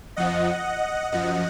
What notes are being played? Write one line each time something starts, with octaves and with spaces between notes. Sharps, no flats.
F2 F3 D#5 F#5
F#2 F3 D#5 F#5